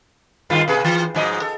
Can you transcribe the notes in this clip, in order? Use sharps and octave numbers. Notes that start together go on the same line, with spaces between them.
G2 D#3 F4
B2 G#4 B4
E3
G#2 F3 D#5
A4